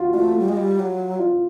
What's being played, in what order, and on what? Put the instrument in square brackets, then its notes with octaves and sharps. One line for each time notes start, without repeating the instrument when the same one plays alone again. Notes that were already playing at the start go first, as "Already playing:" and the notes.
Already playing: [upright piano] F4 F#4
[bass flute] A3 [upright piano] F4
[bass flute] G3
G#3
G3
F#3
[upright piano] F4